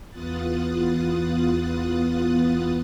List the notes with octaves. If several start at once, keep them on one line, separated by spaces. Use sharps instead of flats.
E2 B3 F4 D#6 F#6 A6